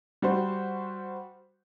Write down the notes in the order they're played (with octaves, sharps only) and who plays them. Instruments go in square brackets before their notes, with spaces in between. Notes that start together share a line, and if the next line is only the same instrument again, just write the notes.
[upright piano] G3 F#4 C5